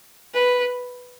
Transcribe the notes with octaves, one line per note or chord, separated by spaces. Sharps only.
B4